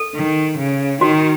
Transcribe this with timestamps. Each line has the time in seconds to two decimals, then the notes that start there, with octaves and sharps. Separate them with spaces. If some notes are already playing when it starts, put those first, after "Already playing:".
Already playing: A4
0.15 D#3
0.58 C#3
1.01 D#3 F#4